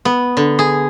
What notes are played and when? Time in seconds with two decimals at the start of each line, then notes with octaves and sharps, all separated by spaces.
0.05 B3
0.37 D3
0.59 G#4